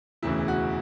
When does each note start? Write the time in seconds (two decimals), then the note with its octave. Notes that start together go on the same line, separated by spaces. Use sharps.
0.23 E1 D2 C#3 E3 E4
0.48 F#4